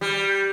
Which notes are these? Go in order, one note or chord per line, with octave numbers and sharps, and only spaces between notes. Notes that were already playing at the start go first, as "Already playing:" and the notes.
G3